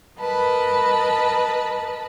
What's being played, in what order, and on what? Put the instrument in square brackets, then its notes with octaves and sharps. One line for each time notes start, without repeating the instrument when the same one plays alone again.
[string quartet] A#4 B4 D#5 A5 B5